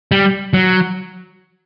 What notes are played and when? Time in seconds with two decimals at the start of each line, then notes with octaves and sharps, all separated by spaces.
0.12 G3
0.53 F#3